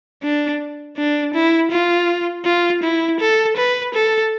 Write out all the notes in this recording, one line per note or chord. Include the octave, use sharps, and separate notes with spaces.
D4
D4
E4
F4
F4
E4
A4
B4
A4